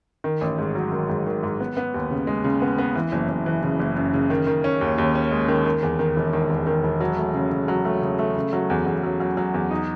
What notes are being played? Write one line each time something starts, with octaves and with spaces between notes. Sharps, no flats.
D#3
A1
G#2
F#3
D#3
G#2
D#3
G#2
B3
B3
D#2
C#3
G#3
C#3
B3
B3
E3
F#1
F#1
E3
C#3
F#1
F#2
C#3
D#3
D#3
C#4
D#2
D#2
C#4
G#3
D#3
D#3
E2
D#3
E1
D#3
E2
D#3
E1
F#3
A3
C#3
C#3
F#3
A3
C#3
A3
C#3
F#3
E2
E2
F#3
F#3
F#3
E2
D#4